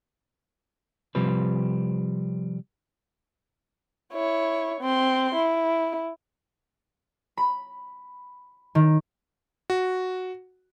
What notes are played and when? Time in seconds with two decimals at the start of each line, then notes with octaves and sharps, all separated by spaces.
1.15 C3 F3 G3 C4 B4
4.13 E4 C#5
4.81 C4 C6
5.35 E4
7.37 B5
8.75 D#3
9.70 F#4